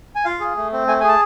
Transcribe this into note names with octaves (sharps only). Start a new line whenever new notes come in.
G#5
F4 F5
G#4
A3
C4
A3 G#5
G#5
G#4 A5